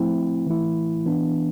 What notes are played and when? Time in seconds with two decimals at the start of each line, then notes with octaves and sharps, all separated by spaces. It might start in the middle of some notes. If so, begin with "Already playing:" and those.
Already playing: F3 A3 C4 E4
0.47 E3 A3 E4
1.06 E3 B3 D4